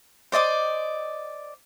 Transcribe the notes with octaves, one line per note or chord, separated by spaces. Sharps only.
C5 D5 D#5 D6